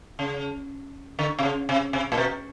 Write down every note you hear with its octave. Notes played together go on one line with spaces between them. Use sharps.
C#3
D3
C3
C#3
C3
C3
A#2
B2